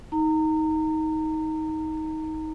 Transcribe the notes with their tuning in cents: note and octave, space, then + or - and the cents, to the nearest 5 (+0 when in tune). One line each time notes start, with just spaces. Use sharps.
D#4 +20 A#5 -30